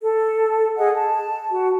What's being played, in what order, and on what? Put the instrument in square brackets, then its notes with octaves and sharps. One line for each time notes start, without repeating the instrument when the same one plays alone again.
[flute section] A4
G#4 D#5 F#5
A5
F#4